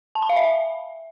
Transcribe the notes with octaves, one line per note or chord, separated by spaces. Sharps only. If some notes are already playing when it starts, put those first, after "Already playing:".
A5
B5
F5
E5